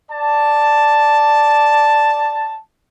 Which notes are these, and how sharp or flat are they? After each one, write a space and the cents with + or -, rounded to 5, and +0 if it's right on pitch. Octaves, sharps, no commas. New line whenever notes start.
D5 +0 A5 +0